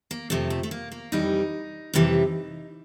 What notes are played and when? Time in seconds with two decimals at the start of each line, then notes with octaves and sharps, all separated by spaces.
0.11 A#3
0.30 F2 C3 F3 A3
0.50 A3
0.63 A3
0.71 A#3
0.92 A#3
1.12 F2 C3 E3 G3 D#4
1.94 F2 C3 E3 G3